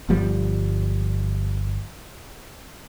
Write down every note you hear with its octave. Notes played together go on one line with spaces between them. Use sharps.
G1 F3 G3